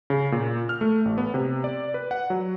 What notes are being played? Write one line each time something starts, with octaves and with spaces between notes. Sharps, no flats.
C#3
A#2
F6
A3
A1
B3
C3
D5
B4
F#5
F#3